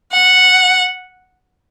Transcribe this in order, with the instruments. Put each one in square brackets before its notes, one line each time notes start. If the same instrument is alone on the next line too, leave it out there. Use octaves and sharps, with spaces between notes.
[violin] F#5